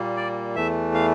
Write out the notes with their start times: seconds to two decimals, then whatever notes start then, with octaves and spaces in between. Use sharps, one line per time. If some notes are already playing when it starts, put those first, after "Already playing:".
Already playing: A#2 G3 A#3
0.16 D5
0.56 E2 E3 A3 E5
0.94 F5